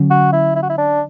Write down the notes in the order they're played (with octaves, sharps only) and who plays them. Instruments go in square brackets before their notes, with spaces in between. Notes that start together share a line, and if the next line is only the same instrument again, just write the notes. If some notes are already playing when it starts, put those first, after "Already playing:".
Already playing: [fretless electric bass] D3 F#3 C#4
[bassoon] F#4
E4
E4
F#4
E4
D4